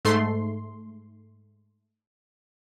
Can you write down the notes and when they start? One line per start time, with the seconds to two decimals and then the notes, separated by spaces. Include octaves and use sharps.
0.05 G#2 A3 C6 C7